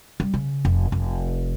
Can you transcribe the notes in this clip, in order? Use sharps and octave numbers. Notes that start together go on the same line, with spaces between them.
G3
C#3
F1
F1